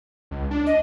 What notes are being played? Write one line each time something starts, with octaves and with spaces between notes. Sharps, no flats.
C#2
D4
D#5